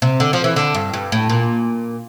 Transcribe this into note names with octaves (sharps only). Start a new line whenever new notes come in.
C3
D3
F3
E3
D3
G2
G2
A2
A#2